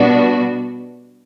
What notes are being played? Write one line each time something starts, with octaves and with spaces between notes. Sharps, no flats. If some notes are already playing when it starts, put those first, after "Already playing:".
Already playing: B2 G3 B3 D4 F#4